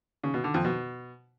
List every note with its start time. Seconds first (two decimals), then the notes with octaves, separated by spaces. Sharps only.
0.23 C#3
0.34 B2
0.44 D3
0.54 F2
0.65 B2